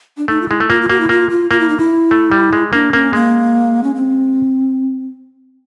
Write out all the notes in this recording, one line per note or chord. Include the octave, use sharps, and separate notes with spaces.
D4
A3 D#4
F4
G#3 E4
A3
A#3 F4
F4
A#3 F#4
E4
A#3 F4
F4
A#3 F4
E4
D#4
E4
A3
G3
G#3
A#3 D4
A#3 C#4
G#3 A#3
C#4
C4